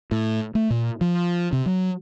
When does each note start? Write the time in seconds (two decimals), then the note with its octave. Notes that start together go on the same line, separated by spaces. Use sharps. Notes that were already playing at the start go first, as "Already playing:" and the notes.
0.12 A2
0.55 A3
0.70 A#2
1.01 F3
1.53 C3
1.66 F#3